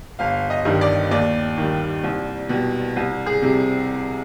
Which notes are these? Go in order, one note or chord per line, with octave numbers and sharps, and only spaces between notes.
G1 F5
D#5
G2 D#3 G3
D5
D#2 D5
D#3 G3
C2
B2 G3
C2
G#4
C3 G3